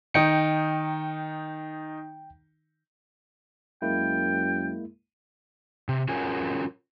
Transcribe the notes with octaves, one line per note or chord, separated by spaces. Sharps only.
D#3 D#4 G5 C#7
F#2 G#3 A#3 E4 G5
C3
C#4 F4 F#4 G#4 A#4 G#5